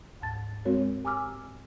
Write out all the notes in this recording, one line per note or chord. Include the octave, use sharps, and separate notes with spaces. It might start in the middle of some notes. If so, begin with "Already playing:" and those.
D2 G#2 A5 A6
G#3 C4 F#4 A#4 C#5
G4 G#5 A#5 D6 E6 F6